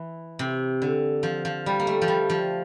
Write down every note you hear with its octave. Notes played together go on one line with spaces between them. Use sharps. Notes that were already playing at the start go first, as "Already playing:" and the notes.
Already playing: E3
C3
D3
F3
F3
G3
A#3
A3
F3
G3
F3